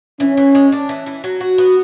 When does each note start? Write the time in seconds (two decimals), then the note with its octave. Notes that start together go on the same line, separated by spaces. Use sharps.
0.20 E3 C#4
0.37 E3
0.55 G#3
0.72 D4
0.89 E3
1.06 E3
1.24 F#3
1.41 F#4
1.58 B3